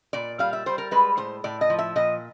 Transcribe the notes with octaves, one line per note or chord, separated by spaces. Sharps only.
A#2 D5
G3 F5
E5
G3 C5
A#4
G#3 B4
A2 C5
A2 D5
D#5
F3
E5
A#2 D#5